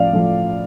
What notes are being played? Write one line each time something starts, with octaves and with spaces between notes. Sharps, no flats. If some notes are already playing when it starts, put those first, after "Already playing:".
Already playing: A2 F3 D5 F5
A2 F3